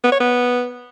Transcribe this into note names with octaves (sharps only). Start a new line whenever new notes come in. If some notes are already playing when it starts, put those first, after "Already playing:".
B3
C#5
B3